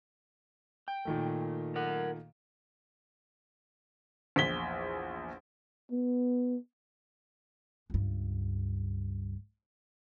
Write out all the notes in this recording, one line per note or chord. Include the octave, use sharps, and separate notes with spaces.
G5
A#2 D#3 A3
A#4 F#5
A#1 E2 B6 G7
B3
C#2 G2